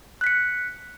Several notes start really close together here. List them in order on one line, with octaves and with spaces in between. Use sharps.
F#6 B6 C#7